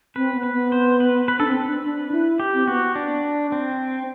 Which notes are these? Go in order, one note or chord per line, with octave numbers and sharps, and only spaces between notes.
C4 B4
B3
B4
B3
C5
B4
B4
D4 A4
C4 B4
D4
D4
E4
G4
C4
B3 F#4
D4
C4